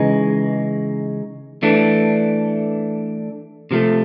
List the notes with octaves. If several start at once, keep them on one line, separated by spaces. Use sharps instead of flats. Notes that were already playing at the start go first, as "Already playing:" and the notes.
Already playing: C#3 E3 G#3 D#4
E3 A3 D4
C3 F3 A3